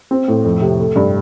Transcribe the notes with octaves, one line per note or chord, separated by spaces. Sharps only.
C4
A2
F2
C3
A3
G2